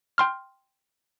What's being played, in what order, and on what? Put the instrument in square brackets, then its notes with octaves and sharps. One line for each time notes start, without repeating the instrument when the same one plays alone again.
[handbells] G5 C6 F6